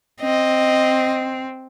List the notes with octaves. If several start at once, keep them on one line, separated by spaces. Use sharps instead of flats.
C4 D#5